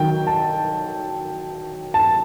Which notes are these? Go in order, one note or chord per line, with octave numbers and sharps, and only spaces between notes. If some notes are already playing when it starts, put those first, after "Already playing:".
Already playing: D#3 F#3 G5
A5
A5